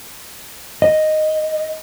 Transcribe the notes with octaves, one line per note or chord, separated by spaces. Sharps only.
D#5